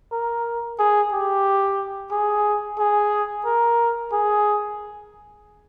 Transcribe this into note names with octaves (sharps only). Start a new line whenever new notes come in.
A#4
G#4
G4
G#4
G#4
A#4
G#4